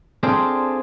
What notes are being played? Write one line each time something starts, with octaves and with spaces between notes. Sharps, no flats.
C4 D4 F4 G#4 A4 C5